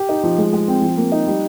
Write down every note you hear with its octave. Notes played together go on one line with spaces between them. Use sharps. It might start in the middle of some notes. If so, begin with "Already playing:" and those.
Already playing: G4
D#4
F3
G#3
G#3
C4
F3
A#3
D#4
G3